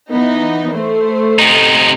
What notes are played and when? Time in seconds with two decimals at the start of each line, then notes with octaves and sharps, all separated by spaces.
0.11 E3 B3 D#4
0.75 A3 C5
1.39 C3 D#4